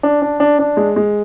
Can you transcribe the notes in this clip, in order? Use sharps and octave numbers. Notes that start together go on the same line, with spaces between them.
D4
D4
D4
D4
G#3
G#3